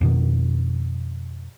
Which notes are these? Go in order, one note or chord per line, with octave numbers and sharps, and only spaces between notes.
F2 B2 D#3